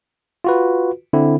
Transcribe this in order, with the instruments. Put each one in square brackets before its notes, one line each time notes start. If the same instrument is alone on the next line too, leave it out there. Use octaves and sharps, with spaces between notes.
[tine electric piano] F4 F#4 B4
D3 C4 E4